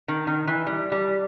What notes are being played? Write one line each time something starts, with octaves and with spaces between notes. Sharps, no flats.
D#3
D#3
E3
G3
G3